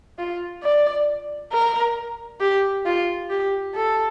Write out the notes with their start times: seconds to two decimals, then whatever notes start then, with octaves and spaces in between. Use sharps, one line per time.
0.18 F4
0.63 D5
1.52 A#4
2.40 G4
2.85 F4
3.30 G4
3.74 A4